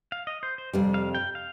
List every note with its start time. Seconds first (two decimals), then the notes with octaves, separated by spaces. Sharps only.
0.12 F5
0.27 D#5
0.43 C5
0.58 C5
0.73 F2 C3 G3
0.94 F5
1.15 G5
1.35 F5